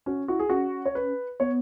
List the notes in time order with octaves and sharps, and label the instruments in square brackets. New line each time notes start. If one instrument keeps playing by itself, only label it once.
[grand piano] C#4 [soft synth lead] F#4
[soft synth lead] E4 [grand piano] F#4
[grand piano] G#4
[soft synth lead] C#4 [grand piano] F#4
[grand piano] C#5
B4
[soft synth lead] B3 [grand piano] C#5